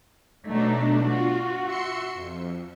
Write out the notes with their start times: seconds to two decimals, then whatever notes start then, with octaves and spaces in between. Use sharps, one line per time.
0.48 B2 F#3 A3 D4 D#4
1.07 F4 F#4
1.65 E5 C6 C#7
2.15 F2